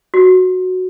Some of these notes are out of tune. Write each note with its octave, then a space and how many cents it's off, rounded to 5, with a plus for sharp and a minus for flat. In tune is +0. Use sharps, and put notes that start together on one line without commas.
F#4 -5